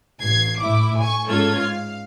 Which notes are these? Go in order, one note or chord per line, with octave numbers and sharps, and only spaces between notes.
A1 G#6 C7
A2 E4 D6
G#5 C#6
G#2 C#4 F4 A4 G#6
F5